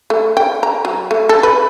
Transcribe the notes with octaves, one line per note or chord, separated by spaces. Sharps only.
A3
G5
A#5
F#3
A3
A4
B4